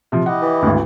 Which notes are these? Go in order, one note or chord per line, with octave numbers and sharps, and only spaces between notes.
C3 F3
E4 G4 D#5 F#5
E3
G#1 D2